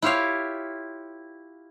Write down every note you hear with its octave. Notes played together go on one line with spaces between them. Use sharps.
E4 F4 G4 C#5 F5